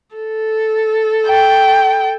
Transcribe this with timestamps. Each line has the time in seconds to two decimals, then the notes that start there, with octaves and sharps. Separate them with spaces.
0.15 A4
1.28 G5